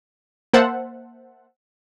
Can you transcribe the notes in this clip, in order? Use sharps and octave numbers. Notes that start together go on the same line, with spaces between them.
A#3 C5 E5 F#5 A5